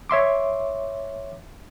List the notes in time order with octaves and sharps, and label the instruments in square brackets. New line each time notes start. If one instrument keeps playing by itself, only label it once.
[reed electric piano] C#5 E5 C6 D6